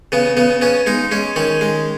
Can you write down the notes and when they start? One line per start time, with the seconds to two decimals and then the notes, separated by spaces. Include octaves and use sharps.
0.12 C#3 B3
0.37 C#3 B3
0.61 B3 C#4
0.86 G#3 D#4
1.11 G#3 C#4
1.36 D#3 C#4
1.61 G#3